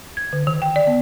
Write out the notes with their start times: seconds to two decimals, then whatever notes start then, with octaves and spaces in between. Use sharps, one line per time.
0.17 G#6
0.33 D3
0.47 D#3
0.62 G5
0.76 D5
0.87 B3